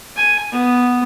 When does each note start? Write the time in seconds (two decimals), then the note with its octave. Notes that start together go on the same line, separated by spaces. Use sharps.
0.16 G#5
0.52 B3